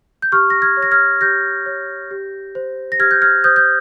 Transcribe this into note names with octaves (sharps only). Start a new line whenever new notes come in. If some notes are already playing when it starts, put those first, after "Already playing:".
G6
G4 C#6 F6
A#6
F6 G#6
C#5
A#6
F6 G#6
G4 G6 A#6
C#5
G4
C5
A#6
G4 F6 G#6
G6
F6 G#6
C5 D#6 G6
G6